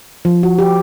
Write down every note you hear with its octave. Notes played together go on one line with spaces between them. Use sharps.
F3
F#4
G4